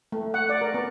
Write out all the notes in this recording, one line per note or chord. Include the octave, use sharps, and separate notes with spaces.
A3
F#5
D5
A#4
B3